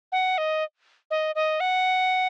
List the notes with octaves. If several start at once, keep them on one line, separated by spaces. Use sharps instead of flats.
F#5
D#5
D#5
D#5
F#5